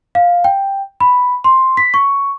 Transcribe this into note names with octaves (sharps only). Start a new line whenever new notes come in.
F5
G5
B5
C6
B6
C#6